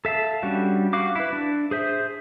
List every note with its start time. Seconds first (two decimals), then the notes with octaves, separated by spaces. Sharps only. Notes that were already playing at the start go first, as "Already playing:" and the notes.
0.05 A4 E5 F5 A5
0.43 G3 C#4 D4 F#4
0.93 F#4 F5 D6
1.16 E4 B4
1.33 D4
1.71 G#4 C5 E5